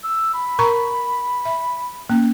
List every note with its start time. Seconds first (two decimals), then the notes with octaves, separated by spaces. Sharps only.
0.04 E6
0.34 B5
0.59 A#4 A#5 C#6
1.45 E5
2.10 A#3 C#4